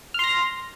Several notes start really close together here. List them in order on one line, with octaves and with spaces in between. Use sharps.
F6 C6 A#6